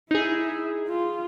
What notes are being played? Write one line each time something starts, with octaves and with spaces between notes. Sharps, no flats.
D#4 E4 G#4 E5
F4